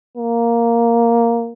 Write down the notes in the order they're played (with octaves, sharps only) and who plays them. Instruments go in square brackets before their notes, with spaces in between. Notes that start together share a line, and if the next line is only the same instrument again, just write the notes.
[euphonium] A#3